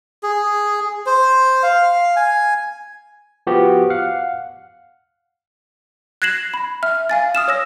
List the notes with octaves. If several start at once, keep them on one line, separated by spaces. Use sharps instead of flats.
G#4
C5
F5
G#5
F3 B3 F#4 G4
F5 F#5
F#6 G#6 A#6 C7 E7 F#7
B5
E5 F6
F5 G#5 A6
D#6 F6 E7
C#5 E6 A#6